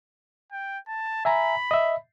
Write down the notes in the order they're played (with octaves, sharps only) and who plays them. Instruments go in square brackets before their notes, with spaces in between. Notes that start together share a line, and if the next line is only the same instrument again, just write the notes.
[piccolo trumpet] G5
A5
[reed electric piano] E5 G#5 A#5 [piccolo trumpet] B5
[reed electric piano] D#5 E5